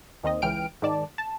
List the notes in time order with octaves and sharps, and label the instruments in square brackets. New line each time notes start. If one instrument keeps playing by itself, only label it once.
[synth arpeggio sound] D#2 D#3 C4 D#5
C#2 E3 G5 F6 D7
G#2 D#3 D5 A5
A5